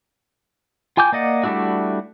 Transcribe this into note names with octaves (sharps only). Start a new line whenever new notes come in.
F4 G5 G#5 D6 G6
A#3 D5 D#5 F#5
G3 A3 D4 E4 F#4